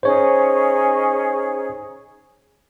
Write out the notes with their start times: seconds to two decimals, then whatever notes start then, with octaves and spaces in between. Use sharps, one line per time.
0.03 C#4 D#4 G#4 C5 C#5